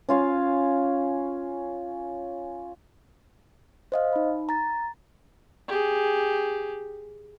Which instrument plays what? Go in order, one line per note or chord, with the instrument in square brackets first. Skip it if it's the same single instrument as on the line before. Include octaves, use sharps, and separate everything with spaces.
[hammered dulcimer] C#4 F4 F5
[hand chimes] C5 D#5 F5
D#4 B5
A#5 A6
[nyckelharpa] G4 G#4